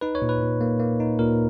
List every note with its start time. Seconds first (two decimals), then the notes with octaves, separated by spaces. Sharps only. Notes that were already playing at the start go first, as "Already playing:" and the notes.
0.01 D#4 B4
0.15 C#5
0.22 A#2
0.29 B4
0.41 A#2
0.61 A#3
0.80 A#3
1.00 D#4
1.19 A#2 A#4